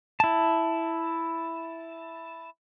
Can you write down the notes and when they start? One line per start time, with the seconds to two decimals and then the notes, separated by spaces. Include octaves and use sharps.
0.20 E4 A5